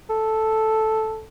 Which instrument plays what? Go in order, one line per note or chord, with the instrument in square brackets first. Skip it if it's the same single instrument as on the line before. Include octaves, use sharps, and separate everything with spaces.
[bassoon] A4